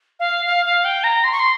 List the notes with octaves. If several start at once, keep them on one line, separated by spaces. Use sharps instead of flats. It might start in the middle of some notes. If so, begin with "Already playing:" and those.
F5
F5
F5
G5
A#5
C6
C#6
C6